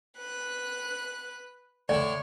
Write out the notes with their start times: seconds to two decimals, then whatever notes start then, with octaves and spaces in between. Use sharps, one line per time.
0.20 B4 F#6
1.89 A2 D3 C#5 D5